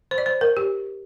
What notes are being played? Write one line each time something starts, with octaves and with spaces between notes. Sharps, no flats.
C5
D5
C5
A#4
G4